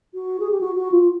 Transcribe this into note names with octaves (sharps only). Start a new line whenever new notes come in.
F#4
G#4
G4
F#4
F#4
F4